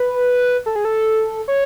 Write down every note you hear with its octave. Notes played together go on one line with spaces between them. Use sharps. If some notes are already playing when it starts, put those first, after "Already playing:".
Already playing: B4
A4
G#4
A4
C#5